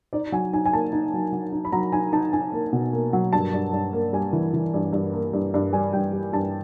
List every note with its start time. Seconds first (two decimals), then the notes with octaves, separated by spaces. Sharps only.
0.13 D#4 D5
0.32 F#3 G#5
0.53 D#4 G#5
0.66 G#5
0.73 A#3 A5
0.92 D#4
1.14 F#3
1.32 F#3
1.52 D#4
1.65 B5
1.72 F#3 A#5
1.92 D#4 G#5
2.12 D#4 A5
2.33 D#4 G#5
2.52 A#3
2.73 B2
2.93 A#3
3.13 F#3
3.33 G2 A5
3.53 G2
3.73 G2
3.93 A#3
4.13 G3 G#5
4.33 E3
4.53 E3
4.74 G2
4.93 G2
5.13 A#3
5.33 G2
5.54 G2
5.73 G3 G#5
5.93 G2 G5
6.13 G3
6.33 G2 A5